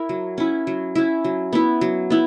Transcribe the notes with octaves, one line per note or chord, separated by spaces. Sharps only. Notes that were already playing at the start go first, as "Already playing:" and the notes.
Already playing: E4 A#4
F#3
C#4 E4
F#3
C#4 E4
F#3
B3 E4
F#3
B3 E4